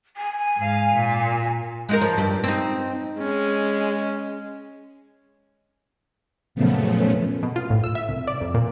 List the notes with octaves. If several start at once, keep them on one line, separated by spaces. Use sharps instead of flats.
G#5
G#2 F5
A#2
G#3 D#4 A#4
F3
G2 G3
C4 D#4
G#3 C#4
F#2 A#2 C#3 F3 A3 B3
B2
F4
A2
E6
E5
C2
D5
F2
A#2